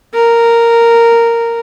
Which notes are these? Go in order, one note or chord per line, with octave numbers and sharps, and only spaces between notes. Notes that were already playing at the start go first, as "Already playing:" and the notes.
A#4